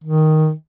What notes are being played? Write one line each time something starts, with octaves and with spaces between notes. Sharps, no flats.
D#3